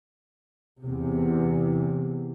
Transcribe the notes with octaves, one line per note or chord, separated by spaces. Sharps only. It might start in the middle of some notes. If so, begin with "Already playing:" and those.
E2 C3